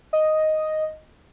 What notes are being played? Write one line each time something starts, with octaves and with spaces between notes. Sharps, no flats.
D#5